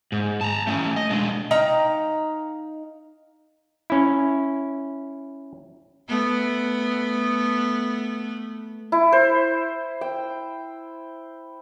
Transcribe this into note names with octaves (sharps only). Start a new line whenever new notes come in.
G#2
A5 A#5
A3 C#4
D#5
G#3 D4
D#4 F5 G5 A#5
C#4 E4
A3 B3
E4
C5
G5